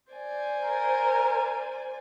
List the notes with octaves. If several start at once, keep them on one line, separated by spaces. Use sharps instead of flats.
C5 D5 G#5
A#4